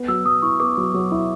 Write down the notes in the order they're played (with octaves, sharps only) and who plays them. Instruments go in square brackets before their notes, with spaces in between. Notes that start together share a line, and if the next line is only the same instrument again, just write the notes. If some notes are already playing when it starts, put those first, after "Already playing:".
Already playing: [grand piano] B3
[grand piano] F#3 [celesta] E6
[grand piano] F#3 [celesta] D#6
[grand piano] E4 [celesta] C#6
[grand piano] B3 [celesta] D6
[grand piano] F#3
F#3
E4